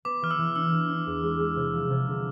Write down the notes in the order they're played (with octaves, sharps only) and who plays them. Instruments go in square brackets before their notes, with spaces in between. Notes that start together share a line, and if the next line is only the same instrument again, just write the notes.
[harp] B3 [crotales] D6
[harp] E3 [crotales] F6
[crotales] E6
[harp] E3
[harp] D4 [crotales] E6
[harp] E3
D4
E2
G#3
G#3
C3
F3
C3
D3